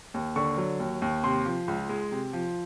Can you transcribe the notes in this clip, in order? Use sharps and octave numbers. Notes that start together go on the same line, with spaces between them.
D#2
D3 C#6
F#3
D#2
D#2
C3 C6
F3
C#2
G#3
C3
F3